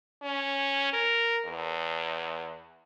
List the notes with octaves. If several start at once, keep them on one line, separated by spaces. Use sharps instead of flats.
C#4
A#4
E2